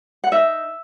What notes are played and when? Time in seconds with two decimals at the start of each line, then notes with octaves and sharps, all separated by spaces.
0.24 F#5
0.32 D#4 E5